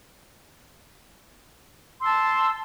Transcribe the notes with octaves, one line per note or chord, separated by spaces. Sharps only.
A5 C6 E6